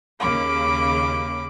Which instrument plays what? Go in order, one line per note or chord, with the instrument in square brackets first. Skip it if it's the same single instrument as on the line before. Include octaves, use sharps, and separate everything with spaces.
[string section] D#2 C#3 A#3 [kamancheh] B5 D6